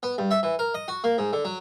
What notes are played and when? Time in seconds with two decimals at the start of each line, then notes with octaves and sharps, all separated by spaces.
0.03 B3
0.18 G2
0.31 E5
0.43 E3
0.59 A#4
0.74 D#5
0.88 F#4
1.04 A#3
1.18 G#2
1.33 D3
1.45 F#3